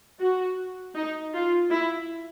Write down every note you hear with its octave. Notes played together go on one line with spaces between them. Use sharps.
F#4
D#4
F4
E4